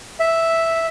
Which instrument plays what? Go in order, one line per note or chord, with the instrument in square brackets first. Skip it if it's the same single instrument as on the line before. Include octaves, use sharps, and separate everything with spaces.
[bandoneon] E5